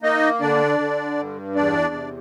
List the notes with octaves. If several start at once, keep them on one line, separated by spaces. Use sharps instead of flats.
A#3 D#4 D#5
D3 D4 D5
D3
G2
E2 D4 D5
C3